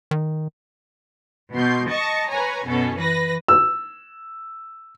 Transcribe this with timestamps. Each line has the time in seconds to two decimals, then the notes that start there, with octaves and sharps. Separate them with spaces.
0.11 D#3
1.54 B2 C6 G6
1.89 D#5 A5 C#6 A#6
2.29 B4 C#5 G#5 A#5
2.66 F#2 B2 C#4 A4
2.96 E3 B4 A#6
3.48 E6